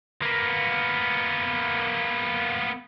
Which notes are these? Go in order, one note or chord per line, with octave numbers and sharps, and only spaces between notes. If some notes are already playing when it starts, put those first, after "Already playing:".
A#3 B3